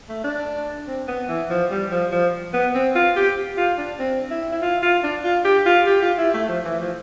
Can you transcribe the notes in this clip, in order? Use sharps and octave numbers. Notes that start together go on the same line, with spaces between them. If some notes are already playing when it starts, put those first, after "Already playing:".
A3
D4
C4
B3
E3
F3
G3
F3
F3
B3
C4
F4
G4
F4
D4
C4
E4
E4
F4
F4
D4
F4
G4
F4
G4
F4
E4
A3
F3
E3
F3